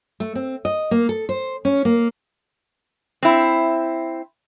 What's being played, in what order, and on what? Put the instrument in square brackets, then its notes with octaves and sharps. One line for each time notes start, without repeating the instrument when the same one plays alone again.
[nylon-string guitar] A3
C4
D#5
A#3
A4
C5
C#4
A#3
[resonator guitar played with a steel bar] C4 E4